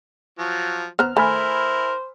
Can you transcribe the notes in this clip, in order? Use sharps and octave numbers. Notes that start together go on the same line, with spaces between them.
F3 F#3
B3 C5 A#5 F6
A3 E4 A#4 C5 G#5 B5 F6